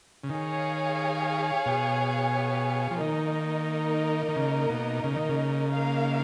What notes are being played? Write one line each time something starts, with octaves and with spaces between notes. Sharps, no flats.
C#3
D#3 G#4 C#5 F5 G#5
B2
F3
D#3 A#3 D#4 A#4 D#5
D#3
C#3
B2
C#3
D#3
C#3
A#3 D#4 A#4 F5